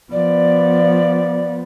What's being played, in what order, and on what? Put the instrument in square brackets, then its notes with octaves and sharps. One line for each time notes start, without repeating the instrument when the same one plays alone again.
[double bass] F3 B3 [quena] D5